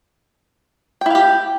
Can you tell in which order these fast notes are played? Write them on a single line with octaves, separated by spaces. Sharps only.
G5 E4 F5 G4